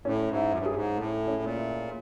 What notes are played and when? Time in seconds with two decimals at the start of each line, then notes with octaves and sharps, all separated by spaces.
0.05 A2 C#4
0.28 G#2
0.35 E4
0.51 F#2
0.58 G2
0.66 F#2 G#4
0.74 G#2
0.96 A2 A3
1.27 C#4
1.42 A#2
1.57 E4